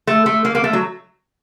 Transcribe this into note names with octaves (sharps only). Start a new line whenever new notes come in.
A3
A3
A#3
A#3
A3
F#3